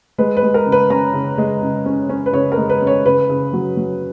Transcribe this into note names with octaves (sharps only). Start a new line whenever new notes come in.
G#3 B4
B4
G#3
A#4
C#3
B4
C#4 A#5
C#3
G#3
C#3
C#4
C#4
B4
C#3 C#5
A#4
G#3
B4
C#4
C#5
C#3 B4
C#3
F#3
F#3